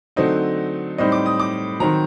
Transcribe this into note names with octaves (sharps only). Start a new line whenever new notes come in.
D3 F#3 A3 C4 D#4 D#5
A2 G3 C4 D#4 D#5
D6
D#6
D6
D#3 F#3 C4 A#5